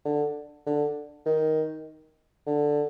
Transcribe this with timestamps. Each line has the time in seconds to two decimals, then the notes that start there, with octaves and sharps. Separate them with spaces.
0.05 D3
0.66 D3
1.26 D#3
2.47 D3